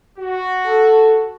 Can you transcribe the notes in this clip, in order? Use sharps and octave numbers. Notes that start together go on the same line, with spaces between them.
F#4
A4